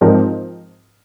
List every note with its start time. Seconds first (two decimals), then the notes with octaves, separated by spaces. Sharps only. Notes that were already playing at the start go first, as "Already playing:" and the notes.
0.01 G#2 F3 C4 D#4 A#4